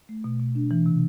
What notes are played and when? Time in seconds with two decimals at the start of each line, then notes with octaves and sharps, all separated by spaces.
0.09 A3
0.24 B2
0.40 B2
0.55 D4
0.71 E3
0.86 C3